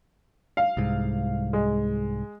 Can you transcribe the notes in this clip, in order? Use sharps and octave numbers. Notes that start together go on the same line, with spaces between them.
F5
C2 G#2
G#3